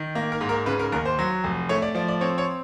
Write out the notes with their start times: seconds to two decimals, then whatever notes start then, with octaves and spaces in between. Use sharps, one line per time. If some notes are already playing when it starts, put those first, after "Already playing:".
Already playing: D#3
0.15 A#3
0.32 A#4
0.41 G#2
0.49 A#4
0.66 C#3 B4
0.79 A#4
0.92 D#2 A#4
1.05 C5
1.19 F#3
1.44 F1
1.69 A3 C#5
1.82 D5
1.95 F3 D5
2.08 D5
2.21 C4 C#5
2.38 C#5